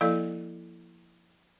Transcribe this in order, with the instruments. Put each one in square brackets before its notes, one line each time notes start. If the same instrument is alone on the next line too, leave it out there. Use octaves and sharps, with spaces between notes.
[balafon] F3 A#3 E4 A4 D5 F5